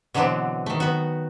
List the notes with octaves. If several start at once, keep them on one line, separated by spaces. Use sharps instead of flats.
B2 D3 E3 F#3 B3 C4
D#3 A3
B3 F#4